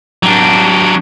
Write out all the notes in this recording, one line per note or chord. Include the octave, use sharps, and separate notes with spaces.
F#3 D4